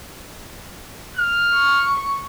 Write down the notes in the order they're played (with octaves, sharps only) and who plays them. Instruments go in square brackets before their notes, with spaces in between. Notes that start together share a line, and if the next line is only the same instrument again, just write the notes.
[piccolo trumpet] F6
[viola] C#6